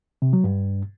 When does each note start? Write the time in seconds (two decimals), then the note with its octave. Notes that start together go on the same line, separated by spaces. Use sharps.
0.22 C3
0.33 F#3
0.44 G2